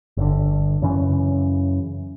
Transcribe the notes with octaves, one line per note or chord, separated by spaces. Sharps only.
G1 D3
F#2 C#3 E3 C#4